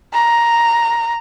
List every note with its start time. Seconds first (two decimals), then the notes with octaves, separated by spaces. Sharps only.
0.14 A#5